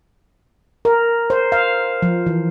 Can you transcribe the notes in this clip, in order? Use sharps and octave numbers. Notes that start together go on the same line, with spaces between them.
A#4
C5
F5
F3
E3